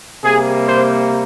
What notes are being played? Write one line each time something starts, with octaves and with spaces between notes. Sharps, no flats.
C3 G3 A#3 G#4
C5